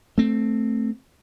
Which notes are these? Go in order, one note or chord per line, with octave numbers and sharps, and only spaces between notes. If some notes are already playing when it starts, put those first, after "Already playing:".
A3 C4